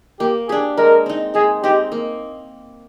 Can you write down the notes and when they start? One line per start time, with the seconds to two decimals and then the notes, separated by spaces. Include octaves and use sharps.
0.20 A#3 G4
0.49 D4 G4 G#4
0.77 G#3 A#4
1.06 C4 D#4
1.35 G#3 G#4
1.63 C4 D#4 G4
1.92 A#3